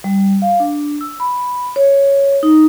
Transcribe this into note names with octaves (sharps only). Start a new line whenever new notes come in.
G3
F5
D4
E6
B5
C#5
D#4